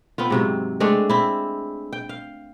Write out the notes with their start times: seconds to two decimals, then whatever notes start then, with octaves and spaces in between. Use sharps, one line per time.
0.18 B3 C4 F4
0.30 G#2 C3 F#3
0.80 G#3 A3 C4 D4
1.10 C4 E4
1.93 G5
2.09 F5